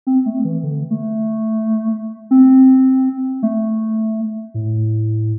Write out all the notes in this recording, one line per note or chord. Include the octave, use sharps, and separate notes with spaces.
C4
A3
E3
D3
A3
C4
A3
A2